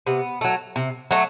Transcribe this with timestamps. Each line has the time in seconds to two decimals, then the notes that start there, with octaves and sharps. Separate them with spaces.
0.07 C3 B3
0.41 F#3 A3
0.76 C3
1.11 F#3 A3